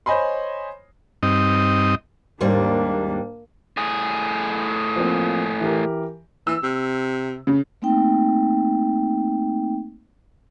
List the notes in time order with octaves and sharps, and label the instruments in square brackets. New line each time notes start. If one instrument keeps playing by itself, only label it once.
[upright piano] C5 C#5 D#5 G#5 B5 C6
[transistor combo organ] G2 C4 D#4 D#5
[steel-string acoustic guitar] D#2 G#2 G3 [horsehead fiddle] A#3 D4
[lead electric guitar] A2 G#4
[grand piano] F3 A#3 C4
E3 G4 A#4
[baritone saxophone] E3 [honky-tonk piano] E6
[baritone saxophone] C3
[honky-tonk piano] C#3
[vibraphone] A3 A#3 C4 D#4 G5